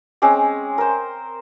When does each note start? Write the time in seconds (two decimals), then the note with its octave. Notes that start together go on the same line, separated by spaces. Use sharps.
0.22 G#3 C4 C#4 D6
0.78 A#4 C5